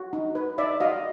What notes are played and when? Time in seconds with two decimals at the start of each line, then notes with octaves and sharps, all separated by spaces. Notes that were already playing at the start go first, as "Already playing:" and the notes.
Already playing: F#4
0.13 D#4
0.35 B4
0.58 D#4 D5 E5
0.80 F#4 D#5 F5